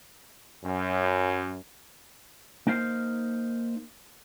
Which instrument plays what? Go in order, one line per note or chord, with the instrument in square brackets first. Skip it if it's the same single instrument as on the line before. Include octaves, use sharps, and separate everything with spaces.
[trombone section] F#2
[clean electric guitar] A#3 D#4 C5 F5